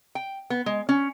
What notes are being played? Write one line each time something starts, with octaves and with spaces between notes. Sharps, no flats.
G5
B3
G#3
C#4